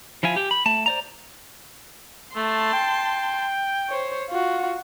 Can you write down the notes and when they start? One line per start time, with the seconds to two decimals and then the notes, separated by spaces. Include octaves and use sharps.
0.23 F3 E4 F4 G#5
0.36 G4 G5
0.51 B5
0.66 A3 A5
0.86 C5 D5 A#5
2.36 A3 A5 C6
2.73 G5
3.89 C5 C#5
4.30 F4 F#4